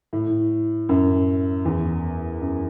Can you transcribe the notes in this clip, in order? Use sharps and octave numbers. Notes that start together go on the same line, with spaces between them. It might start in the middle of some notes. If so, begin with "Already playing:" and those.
A2
F#2
E2
F#2